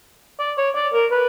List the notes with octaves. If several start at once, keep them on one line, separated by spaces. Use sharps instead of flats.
D5
C#5
D5
A#4
B4